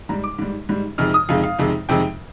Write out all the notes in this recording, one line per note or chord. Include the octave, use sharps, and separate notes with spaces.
G#2 G3 A#5
D6
G#2 G3
G#2 G3
F2 C3 D#3 G#3 F6
D#6
F2 C3 D#3 G#3 F5
F5
F2 C3 D#3 G#3
F2 C3 D#3 G#3 G5